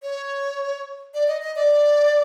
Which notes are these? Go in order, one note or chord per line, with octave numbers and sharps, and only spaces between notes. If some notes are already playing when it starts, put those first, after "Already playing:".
C#5
D5
D#5
D#5
D5